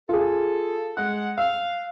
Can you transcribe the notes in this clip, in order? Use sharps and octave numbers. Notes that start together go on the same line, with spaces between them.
F4 G#4 A4
G#3 F#5 F#6
F5 E6